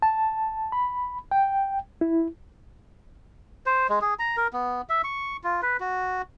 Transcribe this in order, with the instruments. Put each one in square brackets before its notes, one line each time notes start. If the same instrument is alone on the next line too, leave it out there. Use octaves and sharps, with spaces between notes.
[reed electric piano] A5
B5
G5
E4
[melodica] C5
G#3
G#4
A#5
A#4
B3
E5
C#6
F4
B4
F#4